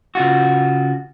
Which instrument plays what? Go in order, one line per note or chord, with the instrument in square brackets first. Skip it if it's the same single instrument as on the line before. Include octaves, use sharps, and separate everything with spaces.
[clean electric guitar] C#3 F4 F#4